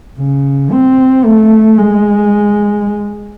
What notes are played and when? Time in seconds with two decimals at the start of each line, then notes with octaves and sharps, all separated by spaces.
0.19 C#3
0.72 C4
1.24 A3
1.77 G#3